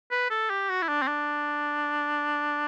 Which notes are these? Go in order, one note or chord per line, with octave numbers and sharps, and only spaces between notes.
B4
A4
G4
F#4
E4
D4
C4
D4